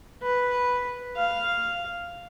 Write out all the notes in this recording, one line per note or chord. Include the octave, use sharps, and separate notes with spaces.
B4
F5